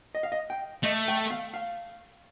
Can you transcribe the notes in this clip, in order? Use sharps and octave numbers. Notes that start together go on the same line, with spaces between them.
D#5
F5
D#5
G5
A3 D#5
G5
F5
F5